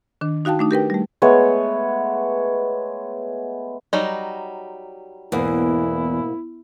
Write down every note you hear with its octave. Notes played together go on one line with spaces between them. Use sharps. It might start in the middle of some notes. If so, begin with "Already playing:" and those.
D#3 D4
D#4 F#4 F5 G5 A5
A3 D4 D#4
G4 A#4 B4 G5
G3 A3
G#3 A3 B3 C#5
F#3 G3 D#4
E2 G#2 B2 A#3 E4